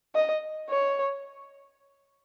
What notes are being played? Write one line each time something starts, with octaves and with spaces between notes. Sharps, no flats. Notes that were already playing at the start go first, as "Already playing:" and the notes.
D#5
C#5